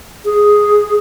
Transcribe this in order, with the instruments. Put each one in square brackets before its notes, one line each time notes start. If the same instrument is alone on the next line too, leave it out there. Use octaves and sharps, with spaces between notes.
[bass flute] G#4